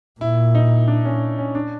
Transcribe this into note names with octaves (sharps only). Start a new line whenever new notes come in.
A#2 E4
D#4
D4
C#4
C#4
D4